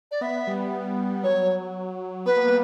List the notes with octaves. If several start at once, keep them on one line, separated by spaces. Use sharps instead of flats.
D5
B3 E5
G3
F#3 C#5
B3 B4
A#3
G3